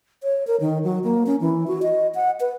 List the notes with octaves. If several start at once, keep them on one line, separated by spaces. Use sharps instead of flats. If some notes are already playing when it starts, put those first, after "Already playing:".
C#5
A#4
D#3
F#3
A#3
C#4
E3
F#4
D#5
F#5
B4